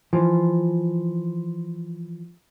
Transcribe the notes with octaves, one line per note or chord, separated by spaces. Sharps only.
E3 F3